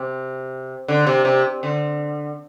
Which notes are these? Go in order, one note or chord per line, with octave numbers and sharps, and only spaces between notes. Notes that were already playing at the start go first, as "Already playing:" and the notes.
Already playing: C3
D3
C3
C3
D3